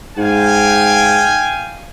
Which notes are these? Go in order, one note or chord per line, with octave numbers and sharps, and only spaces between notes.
G#2 F5 G5 G#5